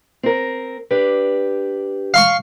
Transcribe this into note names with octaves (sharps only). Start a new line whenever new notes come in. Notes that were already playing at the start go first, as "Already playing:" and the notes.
C4 A#4
D4 G4 B4
F5 C6 C#6